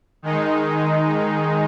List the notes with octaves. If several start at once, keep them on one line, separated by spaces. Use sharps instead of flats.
D#3 G#3 D#4